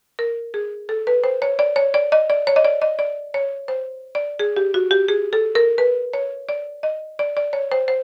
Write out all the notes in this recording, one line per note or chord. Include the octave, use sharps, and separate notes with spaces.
A#4
G#4
A4
B4
C5
C#5
D5
C#5
D5
D#5
D5
C#5
D#5
D5
D#5
D5
C#5
C5
D5
G#4
G4
F#4
G4
G#4
A4
A#4
B4
C#5
D5
D#5
D5
D5
C#5
C5
C5